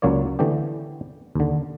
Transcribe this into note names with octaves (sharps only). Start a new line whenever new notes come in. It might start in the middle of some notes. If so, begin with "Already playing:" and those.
C#2 F#3 A#3 C#5 D5
D3 E3 A3 B3 G4
D#2 D3